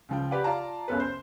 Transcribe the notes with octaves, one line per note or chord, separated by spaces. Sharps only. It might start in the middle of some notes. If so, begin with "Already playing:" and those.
C#2 F3 G5
G4 B4 D5 F#5
F4 D5 A5 A#5
F#1 C#2 B3 C#4 A4 B4
C5